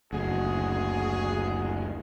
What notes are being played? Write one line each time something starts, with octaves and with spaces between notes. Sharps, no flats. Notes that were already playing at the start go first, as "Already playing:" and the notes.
F#1 D2 F#4 G#4